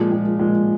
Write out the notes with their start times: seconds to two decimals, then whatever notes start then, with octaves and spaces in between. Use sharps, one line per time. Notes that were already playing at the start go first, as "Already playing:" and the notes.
Already playing: A#2 F3 G#3
0.11 A#2 F3 G#3
0.39 A#2 F3 G#3